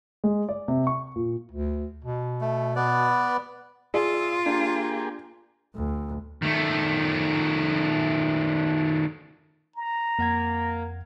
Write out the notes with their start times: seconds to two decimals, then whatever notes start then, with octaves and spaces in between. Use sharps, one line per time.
0.24 G#3
0.49 D5
0.68 C3
0.87 C#6
1.16 A#2
1.52 D2
2.04 B2
2.41 A3
2.76 B3 B4 D5
3.94 F4 G#4 D5 E5
4.46 A#3 D4 G4 G#4
5.75 D2
6.42 D#3 A3
9.76 A#5
10.19 F2 A#3 F#5 G#6